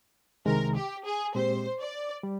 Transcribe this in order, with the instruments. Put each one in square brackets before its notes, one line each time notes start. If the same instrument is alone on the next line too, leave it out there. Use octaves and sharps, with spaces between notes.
[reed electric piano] C2 C3 D#3 G#3 [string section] A#4
[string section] G4
G#4
[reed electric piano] A#2 G#3 C4 G4 [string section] C5
[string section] D5
[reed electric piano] G3